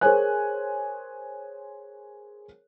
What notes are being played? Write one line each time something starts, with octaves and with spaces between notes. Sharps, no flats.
G#4 A#4 C5 C#5 G#5 F#6